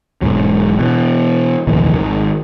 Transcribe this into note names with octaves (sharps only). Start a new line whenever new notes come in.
E1 G#2 F#3
B2 E3
F1 A#1 D#2 E3
G#1 D#3